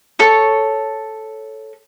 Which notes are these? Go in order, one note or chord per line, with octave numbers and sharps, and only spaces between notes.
A4 C#5 C#6